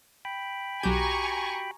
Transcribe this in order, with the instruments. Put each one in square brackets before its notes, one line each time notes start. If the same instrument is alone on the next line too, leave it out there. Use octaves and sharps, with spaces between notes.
[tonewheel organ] G5 B5
[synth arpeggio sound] B1 G6 [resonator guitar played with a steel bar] F#4 G4 [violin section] G#5 A#5 C#6